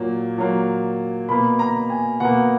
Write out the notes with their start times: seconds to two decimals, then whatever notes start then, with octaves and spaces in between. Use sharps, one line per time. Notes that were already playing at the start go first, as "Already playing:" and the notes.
Already playing: A#2 F#3 A#3
0.38 A#2 F#3 A#3
1.29 B2 A#3 B5
1.59 A#5
1.90 G#5
2.20 B2 A#3 F#5